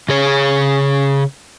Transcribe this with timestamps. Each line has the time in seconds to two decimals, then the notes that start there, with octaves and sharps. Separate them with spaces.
0.09 C#3 G#4 C#5